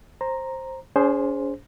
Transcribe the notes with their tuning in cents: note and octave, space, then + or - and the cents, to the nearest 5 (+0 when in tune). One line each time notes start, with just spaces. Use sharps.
C5 +10 A#5 +0
C#4 +45 G#4 +0 C5 +0